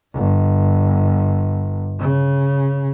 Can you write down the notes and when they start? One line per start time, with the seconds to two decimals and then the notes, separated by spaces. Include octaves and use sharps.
0.15 G1
2.00 C#3